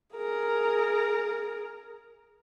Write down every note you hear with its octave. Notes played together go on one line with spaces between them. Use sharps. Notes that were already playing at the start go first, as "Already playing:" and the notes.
G#4 A#4